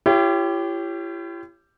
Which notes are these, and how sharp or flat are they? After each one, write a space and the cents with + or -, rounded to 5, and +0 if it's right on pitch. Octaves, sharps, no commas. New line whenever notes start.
E4 +45 G4 +0 C#5 +0